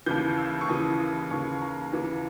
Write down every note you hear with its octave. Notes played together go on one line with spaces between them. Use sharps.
D#2 C#3 E3 G6
E6
C#6
D#2 C#3 E3 D#6
D#2 C#3 E3 C#6
A#5
D#2 C#3 E3